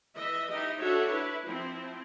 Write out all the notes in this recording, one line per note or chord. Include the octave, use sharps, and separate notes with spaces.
E3 D#5 E5
D#4 E4 G4 D#5
D4 F#4 A4 C#5 E5
E4 B4
F3 C4 E4